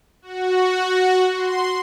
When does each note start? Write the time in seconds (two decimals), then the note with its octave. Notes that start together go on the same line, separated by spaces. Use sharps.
0.22 F#4
1.36 C6